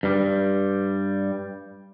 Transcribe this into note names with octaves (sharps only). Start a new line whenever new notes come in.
G2 G3